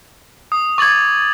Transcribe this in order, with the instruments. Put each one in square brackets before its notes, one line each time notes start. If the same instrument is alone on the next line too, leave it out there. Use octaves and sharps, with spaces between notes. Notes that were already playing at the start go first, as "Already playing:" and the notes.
[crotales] D#6
[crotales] C#6 A6 F#7 [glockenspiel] D6 G#6